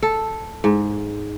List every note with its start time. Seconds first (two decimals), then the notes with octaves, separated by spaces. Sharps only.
0.03 A4
0.64 G#2